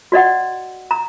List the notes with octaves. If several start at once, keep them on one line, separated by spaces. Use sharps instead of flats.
F#4 D5 D#5 F#5
A#5